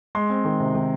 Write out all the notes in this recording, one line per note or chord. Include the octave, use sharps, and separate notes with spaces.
G#3 C6
C4
D#3
C3
D#3